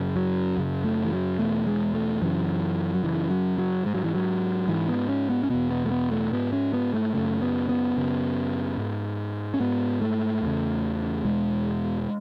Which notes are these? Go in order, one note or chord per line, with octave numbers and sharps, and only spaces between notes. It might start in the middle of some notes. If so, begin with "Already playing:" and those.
Already playing: F#2 C#3
F#3
F#2 C#3
A3
E3
F#3
E2 B2 A3
G#3
A3
F#2 C#3 E3
F#3
F#2 C#3 E3
F#3
F#3
G#2 G#3
F#3
E3
F#3
G#2 E3
B3
C#4
B3
C#4
E2 B2 B3
B3
A3
B3
A3
G#2 B3
C#4
B3
A3
F#2 C#3 A3
B3
B3
F#2 C#3
G#2
C#4
G#2 B3
A3
E2 C#3
E2 B2 G#3